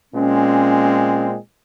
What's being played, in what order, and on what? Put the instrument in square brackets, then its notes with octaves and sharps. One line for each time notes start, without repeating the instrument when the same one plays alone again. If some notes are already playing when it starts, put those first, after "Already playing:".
[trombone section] A#2 G#3 C4 [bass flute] C#4